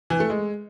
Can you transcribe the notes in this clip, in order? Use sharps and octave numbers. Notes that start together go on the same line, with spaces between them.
E3
A3
G#3